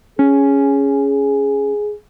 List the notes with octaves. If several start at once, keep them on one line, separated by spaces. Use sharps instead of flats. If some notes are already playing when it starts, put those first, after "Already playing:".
C#4 G#4